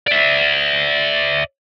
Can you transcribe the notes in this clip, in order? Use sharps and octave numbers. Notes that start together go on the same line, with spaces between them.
D5 E5